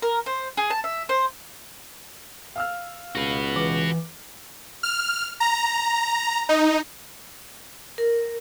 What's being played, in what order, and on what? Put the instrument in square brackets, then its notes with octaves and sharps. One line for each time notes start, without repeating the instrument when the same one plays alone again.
[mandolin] A#4
C5
G#4
A5
E5
C5
[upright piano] F5 E6 F6
[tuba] C#2 [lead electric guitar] F#4 B4
[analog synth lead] E3 [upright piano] D6
[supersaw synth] F6
A#5
D#4
[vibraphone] A#4